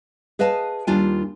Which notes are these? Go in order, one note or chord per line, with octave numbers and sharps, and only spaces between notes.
G#4 B4 D#5 F5 A5
D#2 G3 D4 F4 G#5